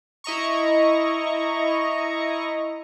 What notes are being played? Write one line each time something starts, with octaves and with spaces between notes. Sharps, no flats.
E4 D#5 A#5 C#6